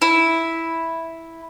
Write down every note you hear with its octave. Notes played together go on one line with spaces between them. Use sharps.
E4